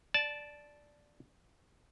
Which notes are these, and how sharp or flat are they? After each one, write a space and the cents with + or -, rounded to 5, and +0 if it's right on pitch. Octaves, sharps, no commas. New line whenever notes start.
D5 +0 A5 -15